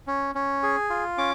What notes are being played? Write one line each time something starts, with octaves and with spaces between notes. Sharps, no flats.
C#4
C#4
G#4
F4
C#4 D6